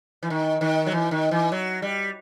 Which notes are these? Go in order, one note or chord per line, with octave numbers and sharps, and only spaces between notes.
E3
D#3
D#3
F#3
E3
D#3
E3
F#3
G3